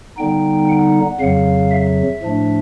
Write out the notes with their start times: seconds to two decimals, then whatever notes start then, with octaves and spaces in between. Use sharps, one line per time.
0.17 D3 G3 B3 D#4 G5
0.69 F#5
1.20 F2 C#3 F#3 F5
1.71 E5
2.23 A2 F3 A3 D4